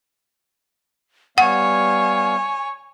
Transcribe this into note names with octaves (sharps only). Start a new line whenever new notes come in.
G3 B3 C#5 F5 F#5 G#5